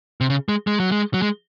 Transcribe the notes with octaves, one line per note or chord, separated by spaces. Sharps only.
C3
C#3
G#3
G#3
F#3
G#3
F#3
G#3